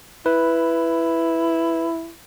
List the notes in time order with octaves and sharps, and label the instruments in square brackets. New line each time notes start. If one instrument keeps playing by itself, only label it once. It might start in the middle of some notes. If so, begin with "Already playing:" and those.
[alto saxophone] E4 [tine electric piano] B4